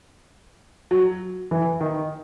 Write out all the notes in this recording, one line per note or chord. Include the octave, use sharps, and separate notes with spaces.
F#3
E3
D#3